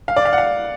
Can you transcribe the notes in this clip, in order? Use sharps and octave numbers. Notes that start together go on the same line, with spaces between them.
F5
D5
F5
F#5
F5